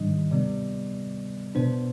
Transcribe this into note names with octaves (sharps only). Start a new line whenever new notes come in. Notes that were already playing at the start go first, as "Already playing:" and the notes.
Already playing: G#2 D#3 G3 D4 D#5
C3 G3 B3 D5
B2 B3 D4 C5